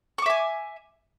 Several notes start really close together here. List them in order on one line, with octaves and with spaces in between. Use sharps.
C#6 D6 E5 G#5